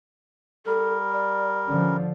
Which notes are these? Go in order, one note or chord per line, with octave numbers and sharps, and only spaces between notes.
G3 A4 A#4
D5
D3 F3 C#4